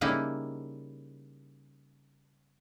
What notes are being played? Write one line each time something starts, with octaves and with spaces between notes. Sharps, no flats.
C#3 G3 A#3 D#4 E4